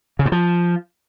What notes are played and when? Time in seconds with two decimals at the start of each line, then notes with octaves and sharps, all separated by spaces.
0.19 C#3
0.26 G2
0.32 F3